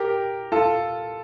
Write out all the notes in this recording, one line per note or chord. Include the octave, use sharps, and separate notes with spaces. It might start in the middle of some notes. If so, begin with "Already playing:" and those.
Already playing: G4 A#4
F4 A4